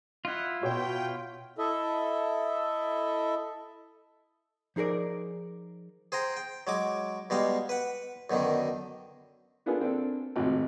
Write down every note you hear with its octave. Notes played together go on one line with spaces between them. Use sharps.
E4 F4 D#5 F#5
B2 F#4 C#5 G5
E4 A4 D#5 E5
F3 D#4 G#4 A#4 D5
G#4 C5 G5 A#5
G5
F#3 G#3 D6
B2 G3 G#3 F5
B4 F#5
F#2 B2 D3 D#3
A#3 B3 D4 F4 G#4 A4
A#3 C4 D4 A4
G#1 F2 A2 C3 F#4